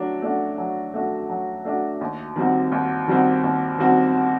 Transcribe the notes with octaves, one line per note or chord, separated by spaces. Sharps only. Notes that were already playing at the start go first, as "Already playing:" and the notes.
Already playing: F#3 A3 D4 F#4
A3 D4 F#4
F#3
A3 D4 F#4
F#3
A3 D4 F#4
D#2
D#3 G3 C4 F#4
D#2
D#3 G3 C4 F#4
D#2
D#3 G3 C4 F#4